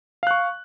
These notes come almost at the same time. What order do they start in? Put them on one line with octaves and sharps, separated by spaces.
F5 F#6 C#6